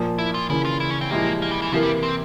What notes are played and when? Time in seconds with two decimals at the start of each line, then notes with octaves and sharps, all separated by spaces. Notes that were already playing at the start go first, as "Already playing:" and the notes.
Already playing: A#2 F3 A#3
0.19 E4
0.34 F4
0.49 C#3 E3 A#3 E4
0.65 F4
0.80 E4
0.90 C#4
1.01 C4
1.11 A#2 F3 G#3 A#3 E4 G4
1.42 A#3
1.51 G3
1.62 E3
1.72 C3 E3 F3 A#3 E4 A#4
1.83 G3
2.03 C4